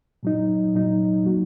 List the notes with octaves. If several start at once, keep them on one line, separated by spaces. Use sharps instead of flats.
A#2 F#3 D#4
A#2 F#3 D#4
F#3 A#3 F#4